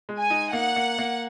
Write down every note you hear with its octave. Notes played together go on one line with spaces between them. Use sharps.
G#3
G#5
D#4
A#3 F#5
A#3
A#3